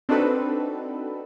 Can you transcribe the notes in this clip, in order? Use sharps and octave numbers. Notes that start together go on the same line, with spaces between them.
C4 D4 D#4 F#4 A4 B4